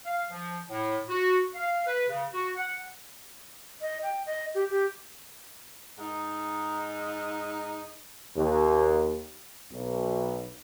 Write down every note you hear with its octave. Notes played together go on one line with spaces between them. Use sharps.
F5
F3
A2
F#4
F5
B4
C#3
F#4
F#5
D#5
G5
D#5
G4
G4
G#2 D#4
D#2
B1